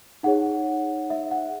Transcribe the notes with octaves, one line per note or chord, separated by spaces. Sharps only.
D#4 G#4 C#5 F#5
E5
F#5